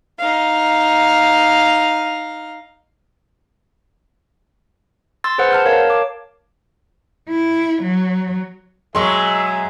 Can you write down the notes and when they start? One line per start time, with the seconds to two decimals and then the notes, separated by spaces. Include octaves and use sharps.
0.19 D#4 F5
5.24 C6 E6 A6
5.38 G#4 B4 C5 F#5 E6
5.51 A5 F6 G6
5.65 A#4 C#5 F5 A5
5.90 D6
7.29 E4
7.82 F#3
8.95 B2 F#3 G#3 G#4 E5 C6 C#6